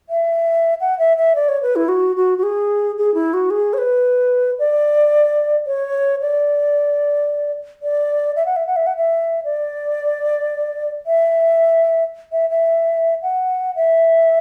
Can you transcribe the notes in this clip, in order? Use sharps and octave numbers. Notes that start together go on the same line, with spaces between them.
E5
F#5
E5
E5
D5
C#5
B4
E4
F#4
F#4
F#4
G#4
G#4
E4
F#4
G#4
C#5
B4
D5
C#5
D5
D5
E5
F#5
E5
F#5
E5
F#5
E5
D5
E5
E5
E5
F#5
E5